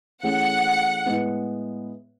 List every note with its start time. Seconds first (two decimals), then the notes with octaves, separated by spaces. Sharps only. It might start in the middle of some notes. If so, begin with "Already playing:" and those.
0.23 E3 A3 C#4 G#4 F#5
1.06 A2 G#3 B3